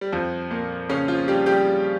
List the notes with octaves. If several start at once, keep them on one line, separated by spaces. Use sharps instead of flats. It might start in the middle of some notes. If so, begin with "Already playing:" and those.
G3
F2 F3
A#2 A#3
C#3 C#4
F3 F4
G3 G4
G3 G4